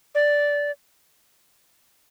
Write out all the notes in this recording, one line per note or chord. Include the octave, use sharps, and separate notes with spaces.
D5